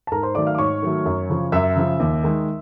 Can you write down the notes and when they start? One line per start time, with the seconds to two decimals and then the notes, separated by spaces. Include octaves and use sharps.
0.07 A5
0.11 G#2 A#4 A#5
0.23 C5 C6
0.35 D#3 F#3 A3 D5 D6
0.46 F5 F6
0.55 D6
0.58 G#2 C#5 C#6
0.82 D#3 F#3 A3
1.06 F#2
1.29 C#3 F3
1.52 F#2 E5 E6
1.76 C#3 F3
2.00 D#2
2.23 D#3 G#3